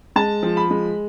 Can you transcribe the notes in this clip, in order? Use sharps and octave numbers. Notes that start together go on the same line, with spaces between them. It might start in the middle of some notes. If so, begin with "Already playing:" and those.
G#3 A5
F3
B5
G#3